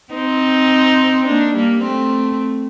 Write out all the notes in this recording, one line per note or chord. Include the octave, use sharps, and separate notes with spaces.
C4 D#4
A#3 D4
G3 A#3
A3 C4